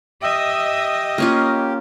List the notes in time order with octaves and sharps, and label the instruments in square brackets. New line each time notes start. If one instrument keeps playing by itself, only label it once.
[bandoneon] G4 [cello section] D#5 [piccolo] E5
[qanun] A#3 C#4 F4